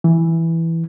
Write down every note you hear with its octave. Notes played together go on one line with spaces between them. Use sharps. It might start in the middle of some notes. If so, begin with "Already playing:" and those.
E3